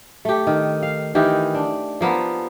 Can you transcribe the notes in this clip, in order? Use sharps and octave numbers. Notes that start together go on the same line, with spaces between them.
A3 G4
D#3
F5
D#3 E3 G4
D4
F3 A#3 B3